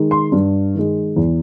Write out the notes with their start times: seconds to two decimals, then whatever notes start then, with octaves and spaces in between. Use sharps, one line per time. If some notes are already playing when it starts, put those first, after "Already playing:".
Already playing: D#3 G#3
0.11 C6
0.32 G2
0.75 D#3 G#3
1.17 E2